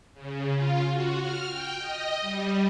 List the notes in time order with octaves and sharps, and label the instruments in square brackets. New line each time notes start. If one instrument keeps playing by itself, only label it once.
[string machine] C#3
F4
F#4
F6
G5
D#5
G3